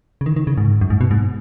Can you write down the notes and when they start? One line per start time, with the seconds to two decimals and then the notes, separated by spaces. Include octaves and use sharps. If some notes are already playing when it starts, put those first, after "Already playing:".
0.21 C#3
0.26 D#3
0.36 D#3
0.47 C#3
0.58 G#2
0.81 F#2
0.90 G#2
1.01 B2
1.11 G#2